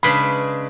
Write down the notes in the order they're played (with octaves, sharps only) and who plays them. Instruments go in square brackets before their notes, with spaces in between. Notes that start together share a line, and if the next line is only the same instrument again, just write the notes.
[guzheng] C#3 G#3 D4 G#4 B4 [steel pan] B5